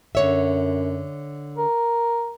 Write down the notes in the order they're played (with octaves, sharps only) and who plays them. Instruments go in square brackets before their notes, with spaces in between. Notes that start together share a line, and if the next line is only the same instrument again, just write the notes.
[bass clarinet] F#2 [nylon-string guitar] D3 C#5 E5
[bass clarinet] A#4